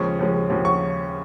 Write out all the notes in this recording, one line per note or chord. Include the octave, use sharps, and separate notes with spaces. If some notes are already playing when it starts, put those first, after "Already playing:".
Already playing: D#2 C#3 F3 G#3 C#6
D#2 C#3 F3 G#3
D#2 C#3 F3 G#3
C#6